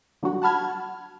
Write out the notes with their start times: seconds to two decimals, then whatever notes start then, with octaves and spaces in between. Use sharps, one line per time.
0.23 D3 F#3 G3 F#4
0.42 F#5 A5 B5 F6 G#6